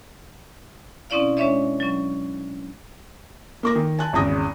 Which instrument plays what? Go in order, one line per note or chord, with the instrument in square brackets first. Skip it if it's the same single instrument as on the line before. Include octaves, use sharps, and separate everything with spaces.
[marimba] B2 C4 C#4 E4 D5 F5
G#3 C#4 D4 C#5 D#5 E5
F#3 C#4
[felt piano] A#3 D6 A#6
D#3
G#5 A5 F#6
G#1 E2 C#3 D#6 A#6